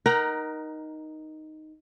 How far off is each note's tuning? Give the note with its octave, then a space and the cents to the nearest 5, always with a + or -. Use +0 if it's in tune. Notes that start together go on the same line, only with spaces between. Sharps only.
D#4 +0 A#4 +20 F#5 +30